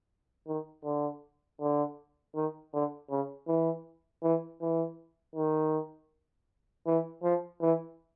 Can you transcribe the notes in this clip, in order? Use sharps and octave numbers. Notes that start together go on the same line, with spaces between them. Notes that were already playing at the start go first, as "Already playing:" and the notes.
D#3
D3
D3
D#3
D3
C#3
E3
E3
E3
D#3
E3
F3
E3